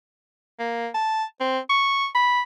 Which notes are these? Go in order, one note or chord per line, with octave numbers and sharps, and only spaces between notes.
A#3
A5
C4
C#6
B5